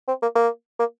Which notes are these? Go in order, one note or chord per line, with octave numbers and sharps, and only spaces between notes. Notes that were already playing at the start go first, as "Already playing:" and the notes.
C4
A#3
A#3
A#3